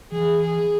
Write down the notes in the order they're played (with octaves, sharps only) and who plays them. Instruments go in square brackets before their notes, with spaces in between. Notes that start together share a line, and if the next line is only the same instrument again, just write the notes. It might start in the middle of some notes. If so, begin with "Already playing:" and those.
[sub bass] E3 [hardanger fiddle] G#4
[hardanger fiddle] G#4